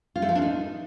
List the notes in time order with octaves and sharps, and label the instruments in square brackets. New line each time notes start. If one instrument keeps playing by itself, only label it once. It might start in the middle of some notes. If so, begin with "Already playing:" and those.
[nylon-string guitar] F4
A3
F3
D4
D#4